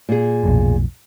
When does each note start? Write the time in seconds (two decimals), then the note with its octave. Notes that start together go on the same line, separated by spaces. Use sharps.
0.09 A#2 G#4
0.43 B1 F2 A2